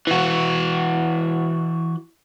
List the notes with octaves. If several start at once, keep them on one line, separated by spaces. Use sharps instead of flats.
E3 F#4